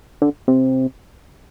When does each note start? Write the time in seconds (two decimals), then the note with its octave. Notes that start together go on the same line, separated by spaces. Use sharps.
0.22 D3
0.48 C3